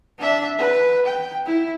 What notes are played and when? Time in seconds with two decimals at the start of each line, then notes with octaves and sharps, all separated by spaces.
0.19 D4 E5
0.58 B4
1.06 G5
1.46 E4